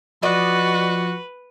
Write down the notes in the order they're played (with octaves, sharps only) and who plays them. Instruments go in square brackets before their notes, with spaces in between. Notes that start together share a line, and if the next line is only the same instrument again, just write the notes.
[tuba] F3 [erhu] F#4 [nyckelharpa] B4 [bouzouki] D5 D#5